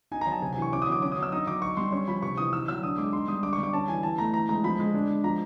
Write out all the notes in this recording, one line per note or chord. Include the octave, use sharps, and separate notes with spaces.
D#4 G#5
A#5
F#3
A5
C3 G#5
G#5
E3 C#6
C#4 D6
D#6
F#3 D6
C#4 D6
D#6
F#3
E6
D#4 D#6
F#3 D6
D#4 C#6
G3 C6
C#4 C#6
F3 B5
C3 C#6
E3 D#6
D#4 E6
F#3 E6
D4 D#6
G#3 D6
D#4 C6
G3 D#6
D4 D6
C#6
G3
D6
C#4 A5
E3 G#5
E3 A5
A3 A#5
E3 A#5
G#3 A#5
F3 B5
G#3
D4
G#3
F3 A#5